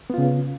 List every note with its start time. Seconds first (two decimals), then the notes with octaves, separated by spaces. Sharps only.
0.10 B3
0.14 F4
0.18 C#3